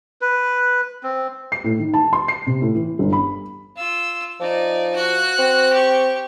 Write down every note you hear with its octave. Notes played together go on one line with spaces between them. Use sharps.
B4
C4
C7
A2
D#3
A5
C6
C7
C3
A2
E3
G1
B5
F4 E6
F3 D#4 D5
F#4 F#6
C4
G4 C#6